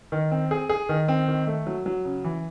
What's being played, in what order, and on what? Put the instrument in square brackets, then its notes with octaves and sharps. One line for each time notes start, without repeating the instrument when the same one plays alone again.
[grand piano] D#3
C4
G#4
G#4
D#3
C4
D#3
A3
F#3
F#3
C#3
E3